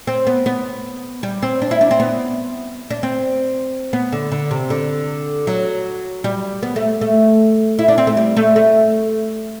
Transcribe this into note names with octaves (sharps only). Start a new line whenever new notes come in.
C4
B3
B3
G3
C4
D4
E4
D4
C4
B3
D4
C4
B3
D3
D3
C3
D3
F#3
G3
B3
A3
A3
E4
D4
C4
A3
G3
A3
A3